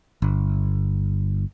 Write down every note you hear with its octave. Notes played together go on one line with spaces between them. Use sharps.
G1